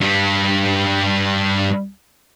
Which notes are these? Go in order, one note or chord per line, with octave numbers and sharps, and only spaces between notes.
G2 G3